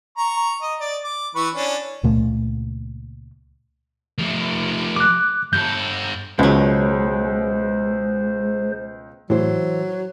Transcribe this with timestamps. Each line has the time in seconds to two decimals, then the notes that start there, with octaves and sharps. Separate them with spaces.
0.18 A#5 C#6
0.62 D#5
0.80 D5
1.04 D6
1.35 E3 B4 C#6
1.55 C#4 D4
2.03 C#2 A#2 A3
4.19 F3 A3
4.96 D6 F#6
5.53 G2 A4 G6
6.39 C#2 B2 F#3 G#3 C5
9.30 A2 E3 F#3 C5